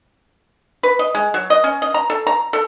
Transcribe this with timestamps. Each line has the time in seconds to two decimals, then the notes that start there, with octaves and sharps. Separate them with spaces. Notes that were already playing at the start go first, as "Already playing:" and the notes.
0.83 B4
0.99 D#5
1.15 G#3
1.34 F#3
1.50 D#5
1.64 C#4
1.82 D#5
1.94 A#5
2.10 A4
2.27 A#5
2.53 A4